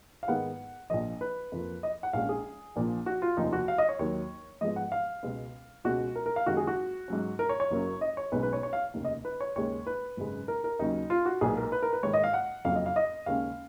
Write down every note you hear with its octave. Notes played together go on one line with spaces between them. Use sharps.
F5
G#2 D#3 G#3 B3 F#5
A#1 A#2 F3 D#5
B4
F2 F3 A#3
D#5
F#5
A#1 A#2 G#3 C#4 F5
G#4
A#1 A#2 F3
F#4
F4
F1 D#2 C#3 F3 D#4
F#4
F5
D#5
C#5
D#2 D#3 F#3 C#5
G#2 F3 G#3 B3 D#5
F#5
F5
C#2 B2 G#3 B3
C#2 B2 G#3 C#4 F#4
A#4
A#4
F5
F#1 F#2 D#3 G#3 F#4
G#4
F#4
G#2 F#3 C#4
A#4
C#5
C#5
F#1 F#2 C#3 F#3 A#3
D#5
C#5
B1 B2 G#3 C#4 B4
B4
C#5
C#5
F5
F1 D#2 C#3
D#5
B4
C#5
D#2 C#3 G#3 C#5
B4
G#1 F#2 C#3 G#3
A#4
A#4
D#2 C#3 F#3 C#4 D#4
F4
F#4
B1 A#2 G#3 B3 G#4
A#4
B4
A#4
B4
G#2 D#3 A#3 C#5
D#5
F5
F#5
F#1 F2 C#3 F#3 F5
D#5
F5
D#5
D#2 C#3 G#3 C#4 F5